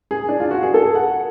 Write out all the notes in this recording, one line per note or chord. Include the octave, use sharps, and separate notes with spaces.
G#4
D4
F4
F#4
G#4
A4
F#5